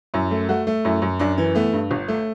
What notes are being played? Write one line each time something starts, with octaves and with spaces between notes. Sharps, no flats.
F#2 E4
A3
A3 F#4
A3
F#2 E4
F#2
F#2 D4
E3
A3 B3
G2
G1
A3